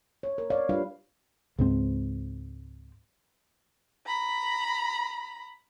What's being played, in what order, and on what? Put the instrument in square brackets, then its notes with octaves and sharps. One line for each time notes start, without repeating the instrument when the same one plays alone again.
[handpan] C#5
A#4
C#5 D5 F5
G3 D4 F4 B4 F5
[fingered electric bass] C#2 G#2 C4
[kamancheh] A#5 B5